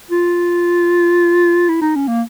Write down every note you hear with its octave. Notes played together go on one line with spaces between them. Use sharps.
F4
E4
D#4
C#4
A#3